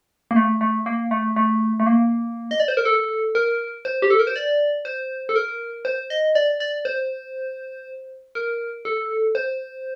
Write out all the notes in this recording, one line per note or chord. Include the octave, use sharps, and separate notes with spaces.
A#3
A3
A3
A#3
A3
A3
A3
A#3
D#5
D5
C5
A#4
A4
A#4
C5
G4
A4
A#4
C5
D5
C5
A4
A#4
C5
D#5
D5
D5
C5
A#4
A4
C5